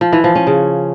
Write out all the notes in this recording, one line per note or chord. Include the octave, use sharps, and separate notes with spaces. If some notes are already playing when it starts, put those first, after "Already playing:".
F3
E3
F3
C#4
C#3